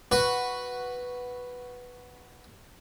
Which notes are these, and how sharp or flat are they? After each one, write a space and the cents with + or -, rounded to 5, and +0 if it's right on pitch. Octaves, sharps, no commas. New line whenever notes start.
F#4 +0 B4 +0